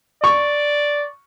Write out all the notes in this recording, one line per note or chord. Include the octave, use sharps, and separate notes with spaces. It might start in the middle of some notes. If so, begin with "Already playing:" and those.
D5 C#6